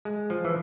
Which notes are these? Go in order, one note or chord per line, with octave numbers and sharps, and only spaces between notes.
G#3
F3
E3